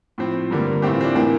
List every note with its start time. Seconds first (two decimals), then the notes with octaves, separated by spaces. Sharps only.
0.18 A2 F3 C4
0.50 G2 D3 G3 A#3
0.82 A2 E3 A3 C4 G4
0.94 F4
1.01 C4
1.04 D4
1.15 A2 E3 A#3 C4